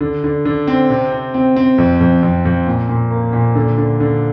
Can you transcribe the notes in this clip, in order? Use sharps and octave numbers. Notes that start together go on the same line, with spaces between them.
D3
D3
D3
C4
C3
C4
C4
C4
F2
F2
F2
F2
A#2
A#2
A#3
A#2
D3
D3
D3